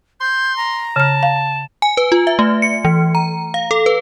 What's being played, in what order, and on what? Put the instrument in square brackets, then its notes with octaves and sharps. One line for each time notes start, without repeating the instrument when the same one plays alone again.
[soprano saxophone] C6 [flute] G6
[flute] A#5
[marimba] C#3 F6 [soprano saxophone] A5
[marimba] F5
[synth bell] G#5
B4
F4
E5
A3
C#7
E3
A#5
F5
A4
B4